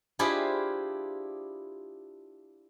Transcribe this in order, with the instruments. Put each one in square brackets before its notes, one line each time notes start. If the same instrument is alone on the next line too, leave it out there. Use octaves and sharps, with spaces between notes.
[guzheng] D4 E4 F4 G4 G#4 C5